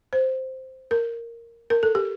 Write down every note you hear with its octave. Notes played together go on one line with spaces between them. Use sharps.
C5
A#4
A#4
A4
G4